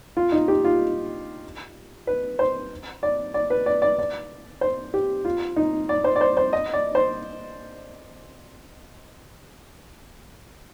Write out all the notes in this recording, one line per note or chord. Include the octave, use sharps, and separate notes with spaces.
F4
D#4
G4
F4
B4
C5
D5
D5
B4
D5
D5
D5
C5
G4
F4
D#4
D5
C5
D5
C5
C5
D#5
D5
C5